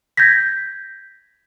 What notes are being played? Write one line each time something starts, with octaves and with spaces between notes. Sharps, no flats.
G6 G#6 A#6 B6